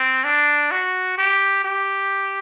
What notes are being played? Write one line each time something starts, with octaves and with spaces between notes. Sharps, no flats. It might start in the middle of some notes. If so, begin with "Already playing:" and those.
Already playing: C4
D4
F#4
G4
G4